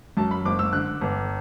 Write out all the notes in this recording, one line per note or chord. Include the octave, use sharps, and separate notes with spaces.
F#2 A5
B5
F#1 D6
E6
D3 F#6
G1